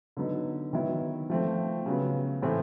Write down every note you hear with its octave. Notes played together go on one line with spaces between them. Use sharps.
D3 F#3 B3 D#4
D#3 F#3 B3 E4
F3 A3 C4
C#3 F#3 B3
A2 E3 A3 C4